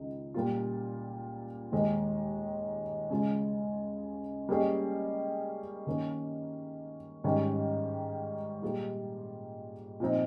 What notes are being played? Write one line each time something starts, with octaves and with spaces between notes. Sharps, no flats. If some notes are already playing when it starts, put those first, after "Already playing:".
Already playing: C#2 D#3 D#4
A#2 G3 A#3 F4
D#2 D#3 G#3 D#4 G#4
C#3 G#3 C#4 F4
G3 A#3 C#4 G#4 D#5
D#3 A#3 C#4
G#2 D#3 G3 C#4
A#2 G3 A#3 F4 G#4
A#2 F3 C4 D#4